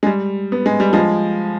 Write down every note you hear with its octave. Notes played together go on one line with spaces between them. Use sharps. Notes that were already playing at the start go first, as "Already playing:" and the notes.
G#3
G3
B3
G#3
G3
F3 G#3